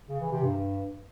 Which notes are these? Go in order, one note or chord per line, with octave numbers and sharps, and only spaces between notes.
C#3
E3
C3
G2